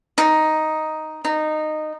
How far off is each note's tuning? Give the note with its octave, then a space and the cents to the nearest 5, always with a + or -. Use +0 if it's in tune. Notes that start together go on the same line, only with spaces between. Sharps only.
D#4 +5
D#4 -15